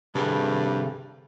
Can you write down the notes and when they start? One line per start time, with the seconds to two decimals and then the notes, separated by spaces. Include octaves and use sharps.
0.15 G2 C3 G#4 A4